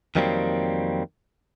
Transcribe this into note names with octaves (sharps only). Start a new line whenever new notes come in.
F2 D#3 F#3 G3 A#3 C4